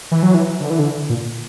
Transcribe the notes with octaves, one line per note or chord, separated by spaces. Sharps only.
E3
F#3
E3
D3
E3
D3
A#2